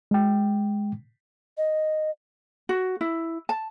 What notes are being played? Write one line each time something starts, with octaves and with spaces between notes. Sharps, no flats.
G#3 G5
D#5
F#4
E4
A5